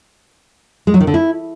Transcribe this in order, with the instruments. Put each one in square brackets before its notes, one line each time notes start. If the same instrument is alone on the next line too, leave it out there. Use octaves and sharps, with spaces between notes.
[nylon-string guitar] G#3
F#3
D#3
D3
E4